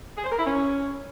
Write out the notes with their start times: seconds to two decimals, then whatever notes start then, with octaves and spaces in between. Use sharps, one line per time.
0.17 G#4
0.24 C5
0.31 A#4
0.38 E4
0.45 C#4